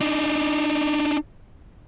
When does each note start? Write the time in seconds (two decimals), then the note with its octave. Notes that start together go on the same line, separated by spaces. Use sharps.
0.01 D4 D#4